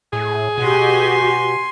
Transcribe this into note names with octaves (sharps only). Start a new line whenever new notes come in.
A2 G#4
B2 F#4 G4 G#5 C6